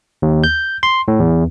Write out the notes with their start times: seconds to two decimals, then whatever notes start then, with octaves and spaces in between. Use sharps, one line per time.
0.22 D#2
0.44 G6
0.83 C6
1.08 A2
1.20 E2